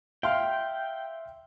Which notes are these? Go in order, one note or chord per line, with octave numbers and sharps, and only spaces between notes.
E5 F5 G5 C6 F6